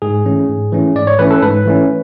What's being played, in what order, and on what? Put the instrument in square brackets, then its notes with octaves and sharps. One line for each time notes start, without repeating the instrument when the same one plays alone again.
[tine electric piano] G#2 G#4
E3 A3 C#4
G#2
E3 A3 C#4
G#2 D5
C#5
E3 A3 C#4 B4
A4
G#2 B4
E3 A3 C#4